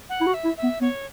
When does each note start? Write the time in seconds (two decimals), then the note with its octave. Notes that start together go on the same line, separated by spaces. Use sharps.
0.09 F#5
0.21 E4
0.27 F#4
0.34 E5
0.45 E4
0.57 E5
0.63 B3
0.81 B3 C#5